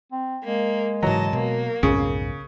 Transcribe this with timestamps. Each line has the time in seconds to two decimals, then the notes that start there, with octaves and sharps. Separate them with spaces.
0.12 C4
0.44 G#3 A#3
1.03 G#2 C#3 E3 F#3 D#5 A5
1.33 B2 A#3
1.83 B1 F2 G#2 C#3